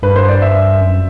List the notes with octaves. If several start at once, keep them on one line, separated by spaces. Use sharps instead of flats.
G2 B4
C5
D5
E5
F#2